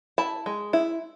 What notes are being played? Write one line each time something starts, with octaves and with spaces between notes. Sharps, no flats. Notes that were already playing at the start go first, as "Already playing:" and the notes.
E4 A5
G#3
E4